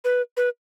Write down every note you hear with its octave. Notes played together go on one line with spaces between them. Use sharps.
B4
B4